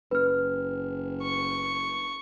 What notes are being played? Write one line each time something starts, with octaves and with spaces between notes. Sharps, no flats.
F#1 B4 F6
C#6